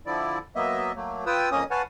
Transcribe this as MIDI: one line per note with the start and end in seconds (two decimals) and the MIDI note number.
0.06 0.39 50
0.06 0.39 53
0.06 0.39 64
0.06 0.39 74
0.56 0.92 54
0.56 0.92 58
0.56 0.92 59
0.56 0.92 75
0.56 0.92 76
0.96 1.25 54
0.96 1.25 57
0.96 1.25 58
1.26 1.49 65
1.26 1.49 71
1.26 1.49 79
1.26 1.49 87
1.26 1.49 88
1.51 1.64 41
1.51 1.64 58
1.51 1.64 61
1.51 1.64 75
1.51 1.64 87
1.71 1.82 71
1.71 1.82 73
1.71 1.82 77
1.71 1.82 78
1.71 1.82 80
1.71 1.82 81